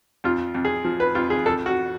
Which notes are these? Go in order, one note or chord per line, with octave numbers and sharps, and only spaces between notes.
F2 F4
F2
G#4
F3
B4
F2 F4
G#4
F2 A4
F#4